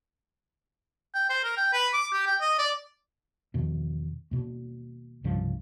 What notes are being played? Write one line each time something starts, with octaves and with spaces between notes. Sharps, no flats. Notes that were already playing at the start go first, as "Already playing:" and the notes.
G5
C5
A#4
G5
B4
D6
G4
G5
D#5
D5
E2 B2 D#3 F3
D#2 B2
C2 G2 C#3 F3